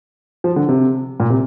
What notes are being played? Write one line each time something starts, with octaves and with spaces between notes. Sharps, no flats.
F3
D3
C3
A#2
C3